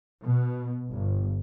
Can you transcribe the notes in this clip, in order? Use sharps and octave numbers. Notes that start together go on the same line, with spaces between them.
B2
G1